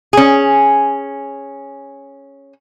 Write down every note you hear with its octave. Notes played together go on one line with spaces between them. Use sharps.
C#4 G#4